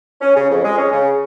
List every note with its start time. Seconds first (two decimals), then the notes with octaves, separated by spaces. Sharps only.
0.21 C#4
0.35 C#3
0.50 F2
0.63 G#3
0.77 C#4
0.92 C#3